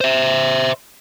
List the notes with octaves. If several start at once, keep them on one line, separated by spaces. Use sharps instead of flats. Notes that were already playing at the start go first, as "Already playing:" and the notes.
C5 E5